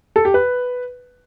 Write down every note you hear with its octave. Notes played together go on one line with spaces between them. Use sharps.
A4
G4
B4